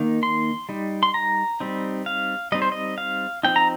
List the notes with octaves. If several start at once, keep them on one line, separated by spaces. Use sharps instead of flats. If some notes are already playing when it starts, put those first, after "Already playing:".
Already playing: D#3 A#3 D#4
C6
G3 D#4
C6
A#5
G3 C4 D#4
F5
G3 C4 D#4 D#5
C5
D#5
F5
F3 C4 D#4 G5
A#5